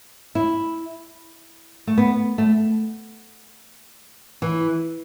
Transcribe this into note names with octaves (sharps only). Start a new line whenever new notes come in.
E4
A3
B3
A3
E3